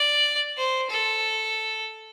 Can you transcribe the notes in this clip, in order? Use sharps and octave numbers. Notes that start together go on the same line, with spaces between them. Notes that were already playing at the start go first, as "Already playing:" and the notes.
Already playing: D5
C5
A4